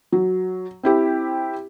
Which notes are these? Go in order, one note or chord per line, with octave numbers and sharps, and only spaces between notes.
F#3
C4 E4 G4